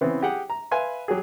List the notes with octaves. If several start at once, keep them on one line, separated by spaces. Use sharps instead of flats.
C#3 E3 B3 C4
G4 G#4 F#5 G5
A#5
B4 E5 F5 G#5 B5 C6
F#3 G4 G#4